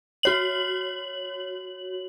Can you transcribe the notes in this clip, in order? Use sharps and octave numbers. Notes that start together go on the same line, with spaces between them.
F#4 C#5 F#7